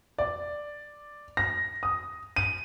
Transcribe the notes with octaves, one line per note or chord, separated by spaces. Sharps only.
D5
A#6
D#6
D#7